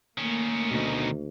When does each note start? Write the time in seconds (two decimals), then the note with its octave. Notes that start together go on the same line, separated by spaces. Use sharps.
0.18 D#3 A3 A#3 C#4
0.71 D2 B2 D#4